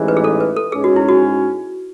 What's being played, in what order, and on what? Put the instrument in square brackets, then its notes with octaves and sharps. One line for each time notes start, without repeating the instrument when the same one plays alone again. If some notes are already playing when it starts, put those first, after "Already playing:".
Already playing: [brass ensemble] A1 G#2 E3 G#3
[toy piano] B4
G#4
A4
B4
A4
[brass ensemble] G#2 G#3 C#4 [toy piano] G#4
[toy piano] F#4
E4
F#4